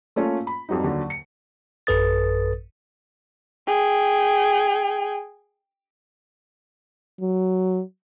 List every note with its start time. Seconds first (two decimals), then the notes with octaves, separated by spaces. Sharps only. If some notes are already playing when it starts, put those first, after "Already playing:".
0.16 A3 A#3 C#4 F4
0.47 B5
0.69 F2 F#3 G3 D#4
0.84 D#2 D3 F#3
1.10 C#7
1.87 A1 F#2 A4 B4 D#6 A6
3.67 G#4 G5
7.21 F#3